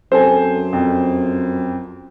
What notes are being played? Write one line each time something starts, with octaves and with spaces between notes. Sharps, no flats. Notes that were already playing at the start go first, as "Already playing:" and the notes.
F#2 C4 A4 C5 G#5
F2